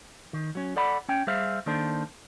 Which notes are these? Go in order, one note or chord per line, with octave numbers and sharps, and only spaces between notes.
D#3
F#3 C#4
A4 D5 F#5 B5
C#4 G5
G3 G#4 C5 E5 F5
D#3 A#3 D4 A4 C5